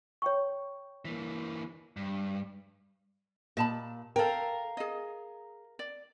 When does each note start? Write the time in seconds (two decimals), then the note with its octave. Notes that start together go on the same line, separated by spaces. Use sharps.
0.22 C#5 G5 C#6
1.05 E3 A#3
1.97 G2
3.57 A#2 D#5 A5 B5
4.16 A4 A#4 F5 G5
4.77 G#4 D#5
5.79 D5